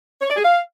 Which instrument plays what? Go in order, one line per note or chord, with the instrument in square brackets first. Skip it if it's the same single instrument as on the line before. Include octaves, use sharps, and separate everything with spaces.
[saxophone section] C#5
D5
G#4
F5